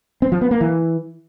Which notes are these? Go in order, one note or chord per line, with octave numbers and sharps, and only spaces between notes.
C4
F3
B3
A#3
E3